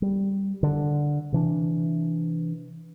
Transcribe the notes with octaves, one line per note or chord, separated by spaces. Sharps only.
G3
D3
C3 E3 D4